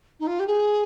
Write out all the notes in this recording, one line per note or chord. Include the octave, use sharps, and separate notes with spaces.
D#4
F4
G4
G#4